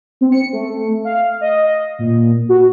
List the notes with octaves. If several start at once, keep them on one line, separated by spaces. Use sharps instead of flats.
C4
C#7
A3
F5
D#5
A#2
F#4